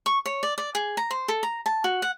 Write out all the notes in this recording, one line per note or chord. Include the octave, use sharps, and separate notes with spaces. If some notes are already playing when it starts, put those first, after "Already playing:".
C#6
C#5
D5
D5
G#4
A#5
C5
A4
A#5
A5
F#4
F#5